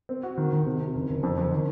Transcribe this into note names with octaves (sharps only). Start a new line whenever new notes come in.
C4
F#4
D#3
D#3
C3
C3
F#1
F#1
F2
F2
D#3